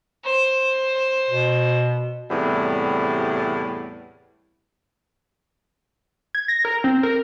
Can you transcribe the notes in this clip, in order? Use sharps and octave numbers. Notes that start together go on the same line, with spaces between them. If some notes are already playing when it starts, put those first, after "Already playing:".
C5
B2
E2 A2 C3 G3
G#6
A#6
A#4
C4
A#4